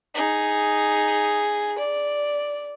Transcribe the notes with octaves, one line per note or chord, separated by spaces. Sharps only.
D#4 G#4
D5